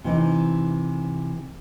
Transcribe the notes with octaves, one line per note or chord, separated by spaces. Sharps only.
C3 E3 D#4